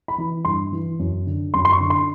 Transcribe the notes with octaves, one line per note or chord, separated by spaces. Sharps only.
B5
E3
G2 C6
E3
F#2
D3
F#2 C6
C6
C#6
D3
C6